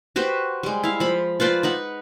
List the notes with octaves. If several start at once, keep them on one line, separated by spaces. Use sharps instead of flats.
F#4 G4 B4 C5
G3 G#3
E4 F5
F3 B5
F4 B4 C5 D5
D#4 B4 F#5